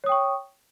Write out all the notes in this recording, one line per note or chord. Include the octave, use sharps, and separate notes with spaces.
C#5 G5 C#6 D#6